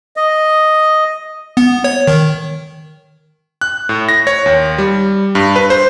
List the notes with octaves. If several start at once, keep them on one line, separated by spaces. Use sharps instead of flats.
D#5
B3
C#5
D#3
F#6
A2
A#6
C#5
D#2
G3
G2
B4
C5